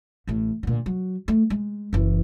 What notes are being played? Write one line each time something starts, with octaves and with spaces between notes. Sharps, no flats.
A1 A2
A#2 D3
F#3
A3
G#3
F#1 E3